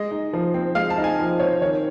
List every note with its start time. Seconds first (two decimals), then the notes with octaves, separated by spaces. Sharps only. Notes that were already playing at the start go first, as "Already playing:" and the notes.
Already playing: G#3 D#5
0.11 D#4
0.33 F3
0.54 C4
0.75 G#3 F5
0.90 A5
0.98 D#4
1.04 G#5
1.19 F3
1.40 C4 C#5
1.61 D#3 C#5